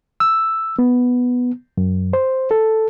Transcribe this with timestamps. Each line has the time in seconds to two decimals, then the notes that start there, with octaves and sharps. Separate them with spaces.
0.20 E6
0.79 B3
1.78 F#2
2.13 C5
2.51 A4